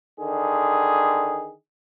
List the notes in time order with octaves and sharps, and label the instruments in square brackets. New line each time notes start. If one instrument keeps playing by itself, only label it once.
[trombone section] D3 D#3 G#4